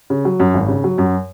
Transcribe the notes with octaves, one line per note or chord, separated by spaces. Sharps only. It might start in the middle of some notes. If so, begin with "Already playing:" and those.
C#3
F#3
F#2
G#1
C#3
F#3
F#2